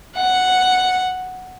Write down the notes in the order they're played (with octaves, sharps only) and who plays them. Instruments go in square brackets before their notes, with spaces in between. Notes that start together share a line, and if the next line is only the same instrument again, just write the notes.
[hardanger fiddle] F#5